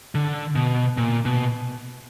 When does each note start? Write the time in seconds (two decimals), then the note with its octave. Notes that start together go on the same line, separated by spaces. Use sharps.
0.15 D3
0.55 B2
0.97 A#2
1.25 B2